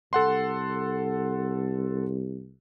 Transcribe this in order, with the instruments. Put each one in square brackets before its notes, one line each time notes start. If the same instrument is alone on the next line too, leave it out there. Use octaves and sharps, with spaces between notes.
[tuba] C2 [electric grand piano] A4 F#5 C6